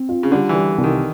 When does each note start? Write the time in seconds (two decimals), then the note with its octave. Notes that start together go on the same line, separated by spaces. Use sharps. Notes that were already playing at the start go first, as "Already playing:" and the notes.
Already playing: C4
0.09 F4
0.23 C#3
0.32 D3 G3
0.49 E3
0.55 G3
0.78 C2
0.84 D#3